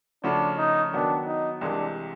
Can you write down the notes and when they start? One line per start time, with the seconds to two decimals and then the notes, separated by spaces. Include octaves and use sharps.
0.23 C#3 F3 A3 C#4 D4 F#4
0.58 D#4
0.93 D#3 F#3 B3 D4
1.27 D#4
1.61 C2 C3 E3 G#3 D4